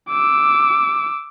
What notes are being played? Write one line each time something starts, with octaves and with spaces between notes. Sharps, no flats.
D6 E6